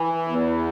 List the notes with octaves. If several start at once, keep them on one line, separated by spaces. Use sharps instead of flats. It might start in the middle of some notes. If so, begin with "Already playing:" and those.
Already playing: E3
E2